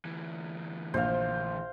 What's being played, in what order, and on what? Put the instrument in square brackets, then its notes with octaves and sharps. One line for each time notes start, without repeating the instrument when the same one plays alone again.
[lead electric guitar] D2 E3
[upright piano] A#1 [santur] C5 F5